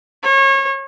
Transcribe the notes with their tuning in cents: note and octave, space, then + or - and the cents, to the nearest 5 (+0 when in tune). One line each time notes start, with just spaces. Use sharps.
C#5 -30